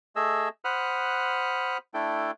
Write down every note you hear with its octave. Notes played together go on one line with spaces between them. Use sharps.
A3 G#4 A4 D#5 E6
C5 F#5 B5 D#6 F6 F#6
A3 D4 E4 A4 G5